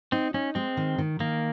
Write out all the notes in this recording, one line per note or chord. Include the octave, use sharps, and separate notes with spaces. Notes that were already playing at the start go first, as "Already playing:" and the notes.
C4 D#4
C#4 D#4
G#3 C4
D#3
D#3
D#3 A#3